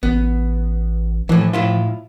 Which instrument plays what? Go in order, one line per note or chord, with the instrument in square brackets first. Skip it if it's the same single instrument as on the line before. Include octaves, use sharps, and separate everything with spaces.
[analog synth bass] A1 [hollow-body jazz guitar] B3
[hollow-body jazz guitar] A2 E3 [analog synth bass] F3
[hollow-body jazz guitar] A2 E4 F4